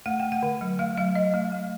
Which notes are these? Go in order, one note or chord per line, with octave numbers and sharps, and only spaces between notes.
A3 F#5
A3 G5
F#5
D3
F#3
A3 F5
F#3 F5
F#3 D#5
A3
A3